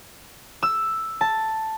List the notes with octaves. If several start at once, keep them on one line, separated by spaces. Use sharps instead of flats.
E6
A5